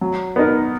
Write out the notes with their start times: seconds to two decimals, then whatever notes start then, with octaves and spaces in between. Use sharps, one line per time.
0.01 F#3
0.36 B3 D#4 A#4